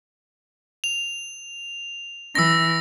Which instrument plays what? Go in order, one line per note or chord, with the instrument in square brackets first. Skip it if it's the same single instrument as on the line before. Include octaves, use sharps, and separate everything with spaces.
[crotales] F7
[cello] E3 [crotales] E6 A#6